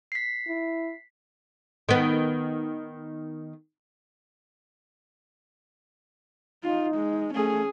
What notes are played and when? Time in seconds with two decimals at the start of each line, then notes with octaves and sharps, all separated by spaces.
0.12 B6 C7
0.48 E4
1.89 D#3 B3
6.64 D#4 F4
6.96 G#3
7.35 A3 C#4 G#4